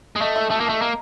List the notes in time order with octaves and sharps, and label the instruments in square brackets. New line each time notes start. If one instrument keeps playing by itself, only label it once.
[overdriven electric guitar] G#3
[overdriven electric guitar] A3 [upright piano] D#5
[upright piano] E5
[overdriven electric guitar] A3 [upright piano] A5
[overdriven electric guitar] A#3
[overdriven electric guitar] A3 [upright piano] A5
[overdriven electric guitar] A#3 [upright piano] A#5